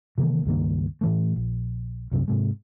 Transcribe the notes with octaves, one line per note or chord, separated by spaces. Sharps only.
C3 D#3 E3 A#3
C#2 G2 D#3 A#3
A2 E3 A3
A#1
C2 F#2 C3
G#2 C3 G#3